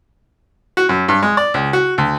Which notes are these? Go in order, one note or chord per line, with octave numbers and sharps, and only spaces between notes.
F#4
F#2
G2
G#3
D5
C#2
F#4
D2